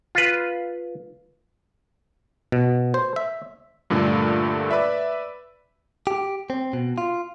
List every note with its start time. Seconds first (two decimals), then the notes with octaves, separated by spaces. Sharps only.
0.15 F4 B4
2.52 B2
2.94 C5
3.16 E5
3.90 G2 A#2 D3 A3
4.71 B4 D5 E5
6.07 G4
6.50 C4
6.73 B2
6.98 F4